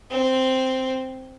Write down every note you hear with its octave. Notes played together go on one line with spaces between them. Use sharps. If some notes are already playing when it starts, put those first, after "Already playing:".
C4